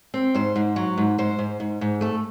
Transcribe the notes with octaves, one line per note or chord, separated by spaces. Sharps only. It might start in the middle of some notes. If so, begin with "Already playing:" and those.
C4
G#2 C5
G#2
F#3
G#2
G#2 C5
G#2
G#2
G#2
A3 A4